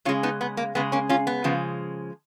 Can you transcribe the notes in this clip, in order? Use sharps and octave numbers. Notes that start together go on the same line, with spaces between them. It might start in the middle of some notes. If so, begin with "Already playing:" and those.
C#3 G#3 C#4 F4
B3 D#4
B3
A#3
C#3 G#3 B3
A#3 C#4
C#4 F4
B3
C#3 F3 G#3